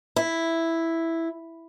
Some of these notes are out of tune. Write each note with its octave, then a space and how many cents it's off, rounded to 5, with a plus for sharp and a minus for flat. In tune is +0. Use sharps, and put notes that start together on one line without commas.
E4 +0